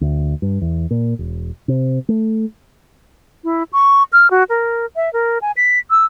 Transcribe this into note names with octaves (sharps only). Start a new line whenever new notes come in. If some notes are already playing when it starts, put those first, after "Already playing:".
D2
G2
E2
A#2
E1
C3
A3
E4
C#6
F6
F#4
A#4
E5
A#4
G#5
B6
E6